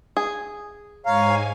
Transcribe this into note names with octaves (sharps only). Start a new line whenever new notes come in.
G#4
G#2 C#5 F5 G#5 A#5